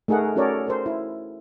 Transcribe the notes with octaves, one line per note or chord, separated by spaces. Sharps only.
A3 D#4 G#4 A#4 F#5
C#4 F#4 A4 A#4 C#5 D5
A4 A#4 C5
E4